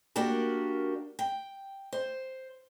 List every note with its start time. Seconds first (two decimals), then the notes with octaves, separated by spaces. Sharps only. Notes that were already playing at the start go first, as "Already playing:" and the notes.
0.16 A#3 D4 F#4 G4 A#4
1.19 G5
1.93 C5